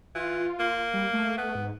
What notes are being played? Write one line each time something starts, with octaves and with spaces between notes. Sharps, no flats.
E3 F4
A#3
G3
A3
B3
G#2